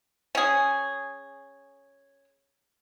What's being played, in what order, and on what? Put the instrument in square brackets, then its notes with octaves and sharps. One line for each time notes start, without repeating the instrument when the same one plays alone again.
[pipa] C#4 G#4